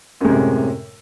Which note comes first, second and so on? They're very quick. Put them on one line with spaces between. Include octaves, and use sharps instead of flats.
F#2 G#3 C3 A2